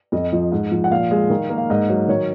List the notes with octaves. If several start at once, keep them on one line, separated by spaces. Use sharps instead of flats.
F2 D#5
F3
G#2
F3
F#5
A#2 F5
G#3
D#3
A#3
F5
G#2 D#5
F#3
D#3 C#5